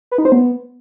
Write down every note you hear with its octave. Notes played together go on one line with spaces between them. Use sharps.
B4
D#4
C5
B3